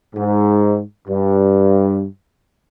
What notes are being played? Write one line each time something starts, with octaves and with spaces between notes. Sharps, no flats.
G#2
G2